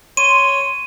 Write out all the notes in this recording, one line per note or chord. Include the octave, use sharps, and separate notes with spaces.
C#5 C6 D#7